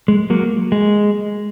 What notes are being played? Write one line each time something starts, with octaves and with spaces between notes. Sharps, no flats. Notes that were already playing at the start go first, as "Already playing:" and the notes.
G#3
F#3 A#3
G#3